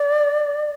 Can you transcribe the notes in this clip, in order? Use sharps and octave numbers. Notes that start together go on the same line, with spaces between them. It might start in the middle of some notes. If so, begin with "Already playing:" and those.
Already playing: D5